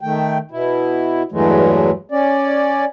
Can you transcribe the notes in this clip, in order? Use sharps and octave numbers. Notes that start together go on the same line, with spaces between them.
D#3 A3 G5
B2 E4
E2 G2 E3 F#3 G#3 A3
C#4 D5